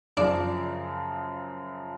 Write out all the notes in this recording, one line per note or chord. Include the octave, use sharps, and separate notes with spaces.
F#2 C#3 F3 D4